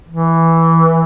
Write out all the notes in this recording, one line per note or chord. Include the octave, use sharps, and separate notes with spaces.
E3